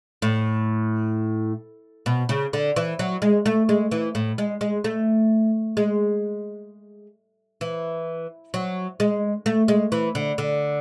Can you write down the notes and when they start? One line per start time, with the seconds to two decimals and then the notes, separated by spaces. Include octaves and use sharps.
0.22 A2
2.06 B2
2.29 C#3
2.53 D3
2.76 E3
2.99 F#3
3.22 G#3
3.46 A3
3.69 G#3
3.91 E3
4.15 A2
4.38 G#3
4.61 G#3
4.84 A3
5.77 G#3
7.61 E3
8.54 F#3
9.00 G#3
9.46 A3
9.68 G#3
9.92 E3
10.15 D3
10.38 D3